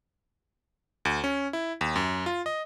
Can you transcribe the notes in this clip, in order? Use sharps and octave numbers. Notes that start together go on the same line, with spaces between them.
D2
C#4
E4
D#2
F#2
F4
D#5